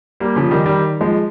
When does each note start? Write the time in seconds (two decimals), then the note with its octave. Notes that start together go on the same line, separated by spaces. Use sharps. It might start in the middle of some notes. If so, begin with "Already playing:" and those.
0.20 G3 A#3
0.36 C#3 F3
0.51 D#3 G3
0.66 D#3 G3
1.01 F3 G#3